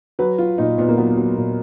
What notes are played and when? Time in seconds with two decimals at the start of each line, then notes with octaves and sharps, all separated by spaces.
0.19 F#3 B4
0.38 F#3 F4
0.58 A#2 D#4
0.78 A#2 B3
0.89 A#3
0.97 F#3 B3
1.17 F#3
1.37 A#2